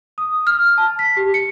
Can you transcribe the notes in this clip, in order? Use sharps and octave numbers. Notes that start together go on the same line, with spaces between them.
D#6
F6
A5
B6
G4
C#7